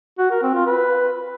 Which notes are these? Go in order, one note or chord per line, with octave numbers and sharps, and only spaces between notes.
F#4
A#4
C4
F4
B4